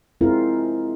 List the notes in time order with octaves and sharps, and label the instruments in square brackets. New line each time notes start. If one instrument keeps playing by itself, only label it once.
[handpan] G#3 C4 E4 F4 A#4